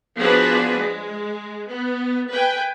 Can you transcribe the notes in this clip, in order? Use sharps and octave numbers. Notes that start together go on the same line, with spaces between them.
F3 B3 D4 F#4 G#4 B4
G#3
B3
B4 G5 G#5